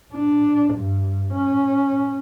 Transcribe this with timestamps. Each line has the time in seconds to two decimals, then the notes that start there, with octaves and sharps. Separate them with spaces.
0.13 D4
0.74 G2
1.33 C#4